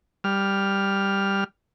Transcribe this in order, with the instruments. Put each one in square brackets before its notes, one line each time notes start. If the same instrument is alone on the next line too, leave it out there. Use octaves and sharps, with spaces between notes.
[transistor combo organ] G3 F6